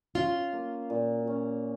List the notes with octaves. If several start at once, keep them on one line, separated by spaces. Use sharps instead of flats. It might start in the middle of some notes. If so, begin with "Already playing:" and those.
C#4 F4
A#3
A#2
C#4